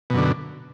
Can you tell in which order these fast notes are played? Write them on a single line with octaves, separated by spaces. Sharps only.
B2 F#2 D3